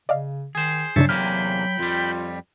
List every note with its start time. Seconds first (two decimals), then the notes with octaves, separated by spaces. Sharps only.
0.09 C#3 D5 D#5 F5
0.55 D#3 G#4 C5
0.96 G2 C#3 F#3 D4 C#5 E5 A5
1.09 E2 C3 A#3 G5 B5 F6
1.79 F2 G3 F4